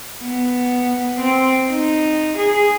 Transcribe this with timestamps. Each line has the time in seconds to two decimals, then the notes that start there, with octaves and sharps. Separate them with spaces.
0.22 B3
1.20 C4
1.68 D#4
2.37 G#4